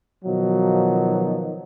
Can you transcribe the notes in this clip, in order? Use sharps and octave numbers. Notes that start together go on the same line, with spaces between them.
B2 D#3 F3 F#3 D#4